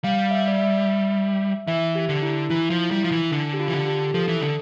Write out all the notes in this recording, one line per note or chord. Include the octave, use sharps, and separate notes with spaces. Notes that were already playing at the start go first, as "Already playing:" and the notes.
G3 F5
E5
D5
E5
E3 E5
G4
D3
E4
E3 E4
F3
G3 E4
F3
E3
D3 D4
G4
F4
E3
D3
G4
F3 A4
E3
D3